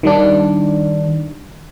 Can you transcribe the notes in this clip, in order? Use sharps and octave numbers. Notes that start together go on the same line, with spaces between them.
D#3 G3 D4